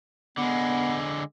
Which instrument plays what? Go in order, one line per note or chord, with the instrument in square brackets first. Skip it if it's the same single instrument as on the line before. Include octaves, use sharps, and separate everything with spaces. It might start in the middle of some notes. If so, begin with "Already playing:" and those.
[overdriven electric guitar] D3 G#3 [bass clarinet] B3